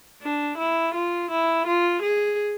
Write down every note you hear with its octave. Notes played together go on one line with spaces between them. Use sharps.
D4
E4
F4
E4
F4
G#4